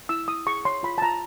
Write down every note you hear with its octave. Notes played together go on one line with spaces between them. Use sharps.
E4 E6
E4 D#6
G#4 C#6
C#5 C6
F4 B5
A5
F4 A#5